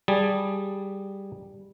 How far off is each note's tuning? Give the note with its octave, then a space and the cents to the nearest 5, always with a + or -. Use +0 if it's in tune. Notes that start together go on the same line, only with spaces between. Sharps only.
G3 +0 G#4 -10 A5 +0